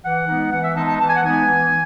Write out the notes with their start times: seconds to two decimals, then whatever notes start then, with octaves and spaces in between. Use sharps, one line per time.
0.04 E3 F#5
0.28 G#3 B3 D#4
0.52 E3 F#5
0.63 E5
0.76 G#3 B3 D#4 A5
0.87 A5
1.00 E3 A5
1.08 G#5
1.17 F#5
1.23 G#3 B3 D#4 G#5
1.47 E3